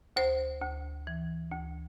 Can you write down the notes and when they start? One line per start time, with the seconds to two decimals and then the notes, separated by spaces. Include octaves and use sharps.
0.16 D2 C5
0.62 D2
1.07 E3
1.52 D2